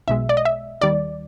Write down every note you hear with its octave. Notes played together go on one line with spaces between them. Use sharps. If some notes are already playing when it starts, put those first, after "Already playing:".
B1 B2 G#3 E5
D5
D#5
E5
D#2 D#3 G3 D5